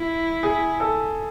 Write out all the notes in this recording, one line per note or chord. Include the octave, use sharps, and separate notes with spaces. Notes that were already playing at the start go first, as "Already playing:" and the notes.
Already playing: E4
G#4
A4